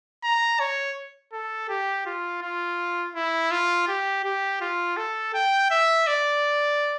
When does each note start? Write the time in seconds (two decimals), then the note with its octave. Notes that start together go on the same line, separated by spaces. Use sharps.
0.24 A#5
0.60 C#5
1.33 A4
1.69 G4
2.06 F4
2.42 F4
3.15 E4
3.51 F4
3.88 G4
4.24 G4
4.61 F4
4.97 A4
5.34 G5
5.71 E5
6.07 D5